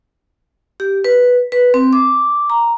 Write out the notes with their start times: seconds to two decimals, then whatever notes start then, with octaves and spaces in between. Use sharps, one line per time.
0.80 G4
1.04 B4
1.52 B4
1.74 C4
1.93 D6
2.50 A#5